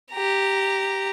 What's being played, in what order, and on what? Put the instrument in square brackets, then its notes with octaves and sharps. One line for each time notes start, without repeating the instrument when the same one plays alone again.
[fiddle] G4 A#5